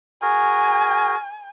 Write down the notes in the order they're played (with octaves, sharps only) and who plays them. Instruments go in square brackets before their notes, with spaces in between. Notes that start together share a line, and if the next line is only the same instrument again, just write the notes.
[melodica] F#4 G#4 A#4 [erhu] G#5